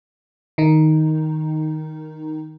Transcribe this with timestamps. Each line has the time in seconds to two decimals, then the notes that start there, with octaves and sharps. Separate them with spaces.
0.58 D#3 D#4